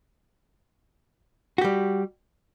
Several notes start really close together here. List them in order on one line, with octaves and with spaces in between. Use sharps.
F#4 G4 G3